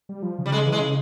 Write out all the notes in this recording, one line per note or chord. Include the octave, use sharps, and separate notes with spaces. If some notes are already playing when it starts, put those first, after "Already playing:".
G3
F3
C#3
G3
C#3 G#3
E3
G#3
C#3